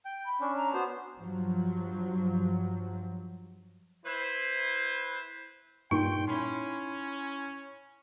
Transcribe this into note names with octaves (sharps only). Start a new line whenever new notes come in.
G5
B5
C#4 D4
A#5
B3 F#4 C5
G2 F3 F#3
E4 B4 C5
G2 A#2 D#4 G5 C6
C#4 E4 B5 C6